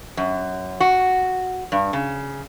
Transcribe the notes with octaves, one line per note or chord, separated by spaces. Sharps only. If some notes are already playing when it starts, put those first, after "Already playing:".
F#2
F#4
G2
C#3